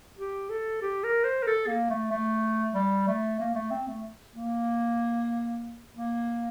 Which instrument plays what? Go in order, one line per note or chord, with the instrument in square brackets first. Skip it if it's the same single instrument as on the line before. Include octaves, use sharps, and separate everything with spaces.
[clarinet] G4
A4
G4
A#4
C5
A#4
A4
A#3
A3
A3
G3
A3
A#3
A3
C4
A3
A#3
A#3